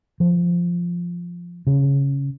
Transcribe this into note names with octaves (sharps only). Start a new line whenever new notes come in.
F3
C#3